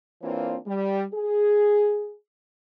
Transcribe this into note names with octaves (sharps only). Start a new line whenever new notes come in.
E3 A#3 C4 D4 F4 C#5
G3
G#4